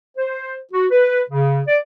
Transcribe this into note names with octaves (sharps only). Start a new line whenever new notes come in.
C5
F#4
B4
C#3
D5